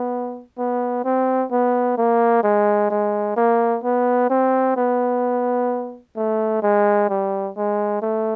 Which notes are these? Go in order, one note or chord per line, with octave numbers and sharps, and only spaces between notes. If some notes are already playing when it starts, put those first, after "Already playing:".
Already playing: B3
B3
C4
B3
A#3
G#3
G#3
A#3
B3
C4
B3
A3
G#3
G3
G#3
A3